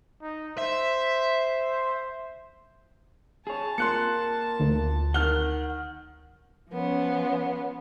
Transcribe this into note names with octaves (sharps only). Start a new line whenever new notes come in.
D#4
C5 E5
G#4 C#5 A5
A#3 F4 A#4 C6 F#6 C#7
D2
D#3 F#5 F6 G7
F3 B3 C#4